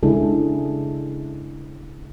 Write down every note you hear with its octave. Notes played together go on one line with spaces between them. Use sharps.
C#3 G#3 D4 E4 G#4 A4